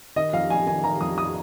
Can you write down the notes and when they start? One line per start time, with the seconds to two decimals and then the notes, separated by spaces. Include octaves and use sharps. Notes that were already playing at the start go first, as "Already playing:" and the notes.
0.16 D#3 D#5
0.33 F2 F5
0.50 F2 G#5
0.66 D#3 G#5
0.84 D#3 A#5
1.00 F2 D#6
1.17 F2 D#6